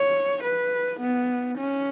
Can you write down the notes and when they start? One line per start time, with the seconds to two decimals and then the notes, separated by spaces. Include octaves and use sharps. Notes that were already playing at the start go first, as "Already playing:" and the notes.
Already playing: C#5
0.43 B4
1.00 B3
1.58 C#4